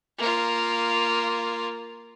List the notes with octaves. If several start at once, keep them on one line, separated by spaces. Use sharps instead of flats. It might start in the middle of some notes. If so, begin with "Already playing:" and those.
A#3 F4